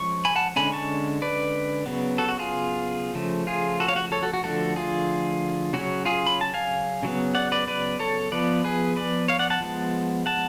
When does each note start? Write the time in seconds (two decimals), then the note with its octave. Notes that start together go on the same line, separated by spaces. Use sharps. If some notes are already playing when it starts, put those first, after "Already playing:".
Already playing: F3 G#3 C#4 C#6
0.25 G#5 B5
0.36 F#5 A5
0.56 D3 G#3 C#4 G#5 B5
0.72 A5 C#6
1.22 B4 D5
1.86 C#3 F#3 B3
2.18 F#4 A4
2.28 F#4
2.39 F4 G#4
3.15 C#3 F3 A3
3.47 F4 G#4
3.80 F#4 A4
3.88 C#5 F5
3.96 F#4
4.12 A4 C#5
4.23 F#4 A4
4.34 F#4
4.44 D3 F3 A3 F#4 A4
4.76 F4 G#4
5.73 C#3 F#3 C#4 F#4
6.05 F4 G#4
6.26 B5
6.41 A5
6.54 F5 G#5
7.03 C#3 F#3 B3
7.35 D5 F#5
7.52 B4 D5
7.67 B4 D5
7.99 A4 C#5
8.32 F3 B3 B4 D5
8.64 G#4 B4
8.96 B4 D5
9.28 C#5 F5
9.39 D5 F#5
9.50 F#5 A5
9.61 F3 G#3 B3
10.26 F#5 A5